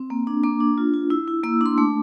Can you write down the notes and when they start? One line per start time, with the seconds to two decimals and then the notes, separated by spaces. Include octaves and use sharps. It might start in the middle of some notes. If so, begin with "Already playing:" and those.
Already playing: C4
0.10 A#3
0.27 D4 D6
0.43 A#3 D6
0.60 D4
0.78 F4
0.94 F4
1.10 E4 E6
1.28 E4
1.44 A#3 E6
1.61 D4 C6
1.78 A3 D6